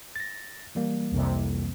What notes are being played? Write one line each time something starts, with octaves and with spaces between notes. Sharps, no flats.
A6 A#6
E3 G3 A#3
C2 F2 C3